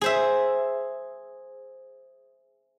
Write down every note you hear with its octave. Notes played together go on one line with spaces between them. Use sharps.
G#4 C5 E5